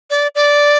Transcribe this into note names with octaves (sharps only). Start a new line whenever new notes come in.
D5
D5